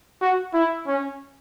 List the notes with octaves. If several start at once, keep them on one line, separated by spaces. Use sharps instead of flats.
F#4
E4
C#4